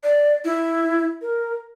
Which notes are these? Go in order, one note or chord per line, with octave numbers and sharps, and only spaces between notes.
D5
E4
A#4